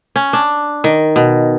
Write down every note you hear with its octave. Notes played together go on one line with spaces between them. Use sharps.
C#4
D4
D#3
B2